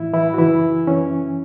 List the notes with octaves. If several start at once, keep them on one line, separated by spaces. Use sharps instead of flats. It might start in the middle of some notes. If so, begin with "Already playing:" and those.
Already playing: A2 E3 E4
E3 E4
F#4
F#2 C#3 E3 E4
F#2 E3 C#4